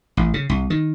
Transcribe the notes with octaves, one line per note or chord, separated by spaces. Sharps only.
A1
C#3
C2
D#3